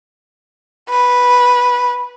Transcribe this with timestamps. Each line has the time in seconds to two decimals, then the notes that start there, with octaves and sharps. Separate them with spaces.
0.90 B4